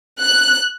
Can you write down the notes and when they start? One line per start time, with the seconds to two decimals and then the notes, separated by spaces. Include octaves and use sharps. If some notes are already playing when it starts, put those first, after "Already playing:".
0.21 F#6